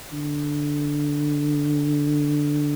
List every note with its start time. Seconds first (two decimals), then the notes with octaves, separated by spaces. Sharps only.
0.12 D3